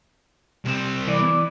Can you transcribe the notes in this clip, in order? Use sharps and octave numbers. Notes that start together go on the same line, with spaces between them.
C2 C4
E3 D5